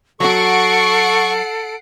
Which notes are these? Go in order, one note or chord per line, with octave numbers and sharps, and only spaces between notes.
F#3 F#4 A4 F#5 C#6 C7 D7